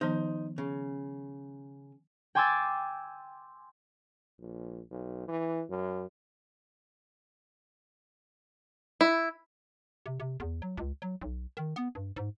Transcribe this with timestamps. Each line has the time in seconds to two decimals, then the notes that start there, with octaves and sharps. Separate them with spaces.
0.01 D#3 F3 B3 D#4 C5
0.58 C#3
2.35 G5 G#5 C6 D6 E6 A6
4.40 A#1
4.90 B1
5.28 E3
5.70 F#2
9.01 E4
10.06 C3
10.20 C3
10.40 E2
10.62 F#3
10.77 C#2
11.02 F#3
11.21 B1
11.57 D#3
11.76 B3
11.95 G2
12.16 G#2